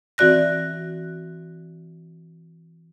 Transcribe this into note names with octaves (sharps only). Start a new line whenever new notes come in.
E3 C4 F#4 D5 F#6 A#6